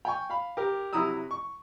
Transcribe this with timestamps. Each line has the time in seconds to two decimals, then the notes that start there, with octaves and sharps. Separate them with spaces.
0.05 G5 G#5 C#6
0.30 F5 B5
0.57 G4 A#4
0.93 C3 F#3 E4 A#5 D#6 E6
1.31 C#6